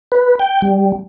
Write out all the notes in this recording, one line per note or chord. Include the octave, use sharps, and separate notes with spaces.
B4
G5
G3